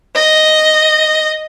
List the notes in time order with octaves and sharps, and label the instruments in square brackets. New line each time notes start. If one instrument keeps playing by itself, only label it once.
[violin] D#5